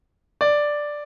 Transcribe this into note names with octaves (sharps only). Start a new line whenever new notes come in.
D5